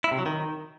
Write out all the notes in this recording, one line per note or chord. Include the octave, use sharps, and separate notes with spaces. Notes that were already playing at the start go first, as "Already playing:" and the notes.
E4
C3
F#3
D#3